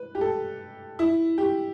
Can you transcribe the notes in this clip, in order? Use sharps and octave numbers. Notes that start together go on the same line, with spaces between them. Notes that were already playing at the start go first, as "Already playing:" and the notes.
Already playing: B4
G4
A4
E4
G4